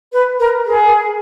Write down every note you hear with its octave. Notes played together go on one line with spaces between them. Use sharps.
B4
A#4
G#4